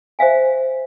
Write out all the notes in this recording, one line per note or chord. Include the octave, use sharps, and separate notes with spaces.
C5 E5 F5 G#5